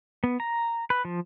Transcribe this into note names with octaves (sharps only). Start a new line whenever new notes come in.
B3
A#5
B4
F3